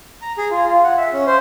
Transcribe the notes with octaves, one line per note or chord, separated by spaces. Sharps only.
A#5
G#4
F4
F4
F#5
E5
C#4
C5